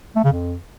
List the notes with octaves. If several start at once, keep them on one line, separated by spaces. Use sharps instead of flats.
A3
C#3
F2